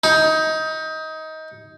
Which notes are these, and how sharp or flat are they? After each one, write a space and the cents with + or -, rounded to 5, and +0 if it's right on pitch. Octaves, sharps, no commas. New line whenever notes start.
D#4 +20